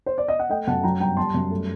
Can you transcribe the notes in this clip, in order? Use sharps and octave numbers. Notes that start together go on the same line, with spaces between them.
C5
D5
D#5
F#5
A3 D#5 G5
F#2 F#5 A5
F#3 G5 A#5
G2 G5 A#5
G3 A5 C6
F#2
A3